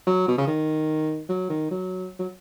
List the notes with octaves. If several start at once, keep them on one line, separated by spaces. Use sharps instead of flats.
F#3
B2
C#3
D#3
F#3
D#3
F#3
F#3